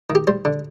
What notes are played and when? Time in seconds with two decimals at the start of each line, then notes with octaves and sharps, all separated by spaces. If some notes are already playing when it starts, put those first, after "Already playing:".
0.10 D#3
0.15 G4
0.27 G3 C5
0.45 D3